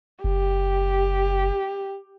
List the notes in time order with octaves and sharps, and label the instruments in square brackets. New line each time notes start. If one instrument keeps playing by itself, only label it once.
[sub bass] F#1 [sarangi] G4